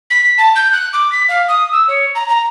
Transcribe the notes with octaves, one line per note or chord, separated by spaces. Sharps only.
B6
A5
G6
F#6
D6
B6
F5
D#6
E6
C#5
A#5
A#5